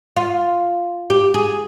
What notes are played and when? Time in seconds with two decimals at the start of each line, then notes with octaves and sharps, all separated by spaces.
0.16 F4
1.10 G4
1.34 G#4